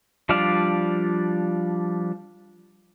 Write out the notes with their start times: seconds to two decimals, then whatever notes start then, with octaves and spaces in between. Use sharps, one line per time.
0.29 F3 G3 D4 D5 F5